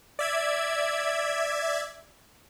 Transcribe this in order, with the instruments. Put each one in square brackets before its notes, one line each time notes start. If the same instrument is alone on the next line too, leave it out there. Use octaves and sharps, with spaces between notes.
[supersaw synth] D5 E5 G#6